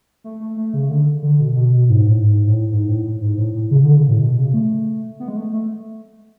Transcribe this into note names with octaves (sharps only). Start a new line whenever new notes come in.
A3
A3
A3
C#3
D3
D3
B2
B2
B2
G#2
A2
G#2
A2
G#2
A2
A2
G#2
A2
A2
C#3
D3
C#3
A2
B2
C#3
A3
B3
G#3
A3
A3